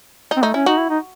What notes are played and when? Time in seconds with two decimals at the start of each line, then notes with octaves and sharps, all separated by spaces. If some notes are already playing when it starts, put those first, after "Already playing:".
0.31 D#4
0.37 C4
0.43 A3 D#4
0.54 C#4 E4
0.66 D#4 F#4
0.78 E4
0.90 D#4